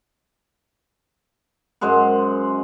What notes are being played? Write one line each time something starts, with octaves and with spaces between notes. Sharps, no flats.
F#2 G#3 C5 F#5